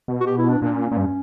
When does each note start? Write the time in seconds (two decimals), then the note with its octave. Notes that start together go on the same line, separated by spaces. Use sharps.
0.08 B2
0.21 F#4
0.26 G4
0.38 E4
0.49 D4
0.62 A#2 D4
0.73 C#4
0.85 C#4
0.91 A#2
0.97 G2